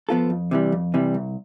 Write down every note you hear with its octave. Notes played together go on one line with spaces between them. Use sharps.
F3 B3 F4 A4
F2
C3 E3 G3
F2
C3 E3 G3
C2